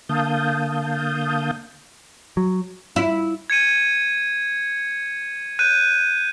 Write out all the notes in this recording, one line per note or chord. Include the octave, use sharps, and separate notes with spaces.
D3 A#3 F5 A5 D#6 G6
F#3
E4
G#6 C#7 D#7
F#6 G6 D#7